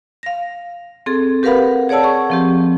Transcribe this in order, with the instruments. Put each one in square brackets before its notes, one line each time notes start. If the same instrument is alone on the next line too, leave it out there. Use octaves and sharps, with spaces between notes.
[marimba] F5 A#6
C4 G#4 A4
G4 A#4 B4 F5 F#5 B5
G#4 C#5 D5 F#5 A5 E6
G#4 C#6
F3 C4 G4